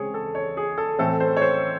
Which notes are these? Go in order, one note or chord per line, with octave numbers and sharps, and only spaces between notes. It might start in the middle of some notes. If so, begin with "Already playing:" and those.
Already playing: C#3 G#3 C4 G#4 C#5
A4
C#5
G#4
A4
A2 E3 C4 A4
C5
C#5
C5